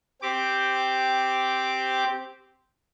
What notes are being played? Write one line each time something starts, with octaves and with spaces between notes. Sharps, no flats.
C4 G4 D6